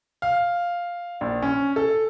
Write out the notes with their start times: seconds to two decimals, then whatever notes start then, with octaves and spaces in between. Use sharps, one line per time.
0.22 F5
1.21 A#1
1.42 C#4
1.76 A4